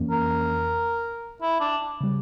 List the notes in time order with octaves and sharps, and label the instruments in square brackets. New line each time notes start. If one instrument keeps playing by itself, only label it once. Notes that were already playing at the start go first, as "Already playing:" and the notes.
Already playing: [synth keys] F2 E3 A#3 C#4
[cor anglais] A#4
E4
D4
[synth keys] C#3 G3